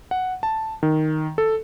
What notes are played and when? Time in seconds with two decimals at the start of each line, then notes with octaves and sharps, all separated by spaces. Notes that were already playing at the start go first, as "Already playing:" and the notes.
0.11 F#5
0.43 A5
0.83 D#3
1.38 A4